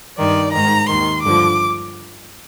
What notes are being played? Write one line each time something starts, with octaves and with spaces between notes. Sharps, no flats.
G2 D#3 D5
G#2 D#3 A#5
D#2 D#3 C6
G2 D3 F3 D6